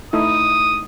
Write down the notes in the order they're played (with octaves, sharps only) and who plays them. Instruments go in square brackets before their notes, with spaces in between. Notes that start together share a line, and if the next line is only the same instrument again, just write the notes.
[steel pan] A3 D#4 E4 [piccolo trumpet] D#6